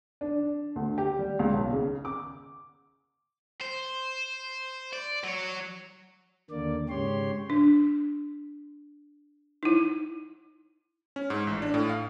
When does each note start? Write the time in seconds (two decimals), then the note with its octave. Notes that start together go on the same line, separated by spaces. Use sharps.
0.21 D4
0.76 D2
0.98 G4
1.19 G3
1.39 C#2
1.54 B1
1.73 C#3
2.05 D6
3.61 C5
4.93 D5
5.24 F#3 C#5
6.50 D#2 D3 A#3 D5
6.89 G#2 C#3 G4 C#5 C6
7.50 D4
9.63 D#4 E4
11.16 C#4
11.30 G#2
11.47 A1
11.62 D4
11.74 A2
11.89 F5